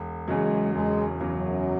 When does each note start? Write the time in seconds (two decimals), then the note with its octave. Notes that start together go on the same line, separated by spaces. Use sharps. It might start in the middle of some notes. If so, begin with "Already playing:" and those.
Already playing: E1
0.27 E2 C#3 F#3 G#3
0.75 E1 G#3
1.20 E2 C#3 F#3
1.36 F#2